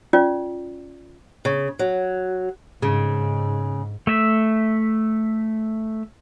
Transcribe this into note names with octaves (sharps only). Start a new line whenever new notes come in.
C#4 F4 D5
C#3
F#3
G#2 C#3
A3 E5